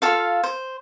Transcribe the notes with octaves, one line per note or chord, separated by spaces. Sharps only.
F4 A4 F5
C5